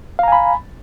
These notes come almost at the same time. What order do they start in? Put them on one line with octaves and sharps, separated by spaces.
F5 A#5 G#5 B5